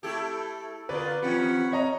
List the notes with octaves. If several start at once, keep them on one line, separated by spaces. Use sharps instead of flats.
A3 E4 G4 A4
D3 B3 F4 B4 D5
D#2 F3 C4 C#4 G4 F#5 B5
C#5 D#5 A#5